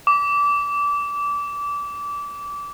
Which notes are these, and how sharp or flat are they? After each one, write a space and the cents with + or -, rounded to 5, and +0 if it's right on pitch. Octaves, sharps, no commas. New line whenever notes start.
D6 -25